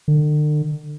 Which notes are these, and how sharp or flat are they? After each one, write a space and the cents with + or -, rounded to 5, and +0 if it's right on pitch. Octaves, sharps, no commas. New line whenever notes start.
D3 +40